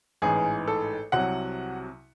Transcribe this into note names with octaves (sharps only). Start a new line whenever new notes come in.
A1 G#2 E3 G#4
A4
C2 C3 F#3 F#5